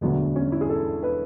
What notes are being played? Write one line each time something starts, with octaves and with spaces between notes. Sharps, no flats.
E1 D2 D3 F#3 B3
C#4
E4
G#4
A4
B4